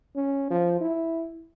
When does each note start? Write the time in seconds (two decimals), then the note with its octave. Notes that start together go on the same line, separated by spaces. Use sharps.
0.15 C#4
0.50 F3
0.81 E4